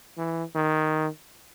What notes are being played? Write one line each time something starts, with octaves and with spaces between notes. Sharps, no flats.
E3
D#3